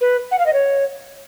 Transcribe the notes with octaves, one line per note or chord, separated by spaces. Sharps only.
B4
F#5
F5
D#5
C#5